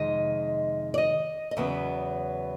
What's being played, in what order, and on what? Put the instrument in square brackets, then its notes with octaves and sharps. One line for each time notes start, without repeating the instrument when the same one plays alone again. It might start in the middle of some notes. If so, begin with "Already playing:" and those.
Already playing: [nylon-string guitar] F2 C3 D#3 G#3 D#5
D5
D#5
D#5
E2 C#3 F#3 B3 E5